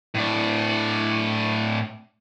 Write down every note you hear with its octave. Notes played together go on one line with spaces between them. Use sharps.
A2 D4